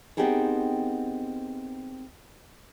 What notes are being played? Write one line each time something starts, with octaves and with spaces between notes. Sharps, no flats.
B3 C4 D#4 G4 G#4 A#4